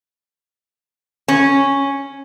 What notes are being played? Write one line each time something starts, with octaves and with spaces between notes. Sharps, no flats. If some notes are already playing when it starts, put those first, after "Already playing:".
C#4